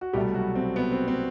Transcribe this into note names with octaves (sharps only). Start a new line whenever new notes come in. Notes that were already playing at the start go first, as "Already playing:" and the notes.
F#4
C2 B2 G3 A3 G4
F#3 F#4
C4
B3
C4
C4